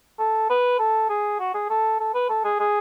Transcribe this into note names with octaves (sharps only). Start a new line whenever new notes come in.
A4
B4
A4
G#4
F#4
G#4
A4
A4
B4
A4
G#4
G#4